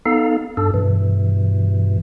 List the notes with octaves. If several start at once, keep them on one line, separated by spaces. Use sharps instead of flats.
B3 D#4 A4 F5
G2 D4 A4
G2 B2 E3